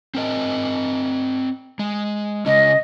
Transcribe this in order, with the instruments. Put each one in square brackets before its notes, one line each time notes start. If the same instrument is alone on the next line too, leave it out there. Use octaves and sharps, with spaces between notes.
[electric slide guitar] C4 A#4 D#5
G#3
[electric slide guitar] C#3 G#3 C#4 [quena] D#5